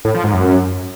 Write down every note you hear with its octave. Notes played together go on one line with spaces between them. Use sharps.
A2
F3
G#2
F#2